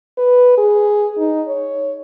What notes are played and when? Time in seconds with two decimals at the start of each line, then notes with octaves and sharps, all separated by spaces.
0.18 B4
0.58 G#4
1.18 D#4
1.47 C#5